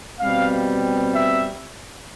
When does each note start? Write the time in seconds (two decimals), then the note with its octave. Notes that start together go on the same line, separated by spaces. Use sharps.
0.19 B2 G3 C4 F5
1.14 E5